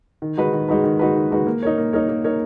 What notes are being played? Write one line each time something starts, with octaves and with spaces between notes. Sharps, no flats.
D#3
G#3 D#4 F#4 B4
D#3
G#3 D#4 F#4 B4
D#3
G#3 D#4 F#4 B4
D#3
G#3 D#4 F#4 B4
A#3
D#4 A#4 C#5
A#3
D#4 A#4 C#5
A#3
D#4 A#4 C#5